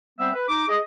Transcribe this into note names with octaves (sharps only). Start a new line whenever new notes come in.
G3 B3 C4 C5 E5
B4
D#4 D6
G#4 D#5